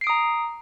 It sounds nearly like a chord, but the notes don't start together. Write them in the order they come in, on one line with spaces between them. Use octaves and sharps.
C7 D7 D#6 A#5